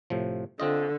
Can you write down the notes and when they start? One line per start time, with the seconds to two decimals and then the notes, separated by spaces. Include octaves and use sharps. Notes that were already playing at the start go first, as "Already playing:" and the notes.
0.10 A2 C3 F3
0.60 D3 C4 F4 D#5